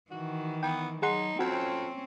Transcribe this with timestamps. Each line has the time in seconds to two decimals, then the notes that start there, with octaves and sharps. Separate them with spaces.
0.11 D#3 E3 F#4
0.63 B3 G5
1.02 F#3 D#4 G#4 F#5 C6
1.39 F2 C4 C#4 F#4